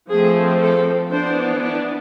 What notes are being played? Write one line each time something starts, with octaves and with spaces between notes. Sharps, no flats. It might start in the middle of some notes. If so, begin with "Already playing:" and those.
F3 A3 C4 G#4
A4
E3 B3 D4 C5
D4